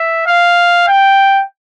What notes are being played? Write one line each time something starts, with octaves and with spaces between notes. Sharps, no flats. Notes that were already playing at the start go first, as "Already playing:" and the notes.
Already playing: E5
F5
G5